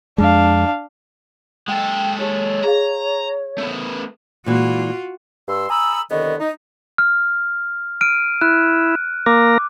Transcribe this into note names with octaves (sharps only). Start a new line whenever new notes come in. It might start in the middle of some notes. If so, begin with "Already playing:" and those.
F2 G#3 D4 F5
G#3 A4 D#5 F#5 G5
D#4 G4 C#5 A5
G#4 D#5 F5 A#5
A3 B3
A#2 E3 G#3 F4 F#4
G2 C6 E6
G#5 A#5 B5 D#6 E6
C2 D3 D#3 B3 C#5 D#5
D#4
F6
F6 D7 D#7
E4 F#6
A#3 A#4 D6